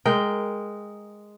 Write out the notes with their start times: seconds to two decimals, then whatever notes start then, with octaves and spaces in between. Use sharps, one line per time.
0.05 G#3 A#4 G5